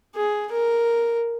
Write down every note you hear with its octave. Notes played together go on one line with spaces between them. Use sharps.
G#4
A#4